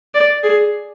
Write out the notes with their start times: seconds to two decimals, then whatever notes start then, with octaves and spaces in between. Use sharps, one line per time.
0.14 D5
0.43 G#4